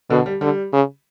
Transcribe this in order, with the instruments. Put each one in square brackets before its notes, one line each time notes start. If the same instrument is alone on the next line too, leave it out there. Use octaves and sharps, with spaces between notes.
[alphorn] B2 [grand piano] D3
[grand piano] G3
[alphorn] D3 [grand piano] G3
[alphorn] C#3